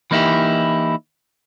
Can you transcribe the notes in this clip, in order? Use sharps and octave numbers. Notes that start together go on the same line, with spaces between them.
E3 A#3 D#4 E4 G4